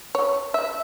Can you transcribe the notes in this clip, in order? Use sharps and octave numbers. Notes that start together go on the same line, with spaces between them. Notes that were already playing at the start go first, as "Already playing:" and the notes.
C#5
E5